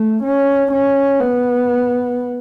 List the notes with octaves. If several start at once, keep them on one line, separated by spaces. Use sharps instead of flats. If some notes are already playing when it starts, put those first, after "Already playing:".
Already playing: A3
C#4
C#4
B3